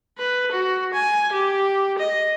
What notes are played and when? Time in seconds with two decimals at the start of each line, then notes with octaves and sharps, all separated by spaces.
0.18 B4
0.51 F#4
0.94 G#5
1.32 G4
1.98 D#5